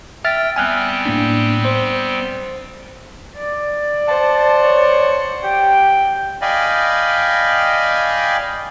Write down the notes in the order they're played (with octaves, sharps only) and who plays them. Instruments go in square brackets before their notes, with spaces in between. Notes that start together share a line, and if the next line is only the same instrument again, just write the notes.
[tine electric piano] E5 F6 A6 [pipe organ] G5
[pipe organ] G3 B3 C4 [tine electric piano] G#5 F6 F#6
[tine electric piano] A2 A#3 D4
C5
[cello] D5
[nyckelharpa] C5 F#5 [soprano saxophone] A5
[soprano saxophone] C#5
[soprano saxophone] G4 [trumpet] G5
[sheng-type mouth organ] D5 D#5 F5 G5 G#5 B5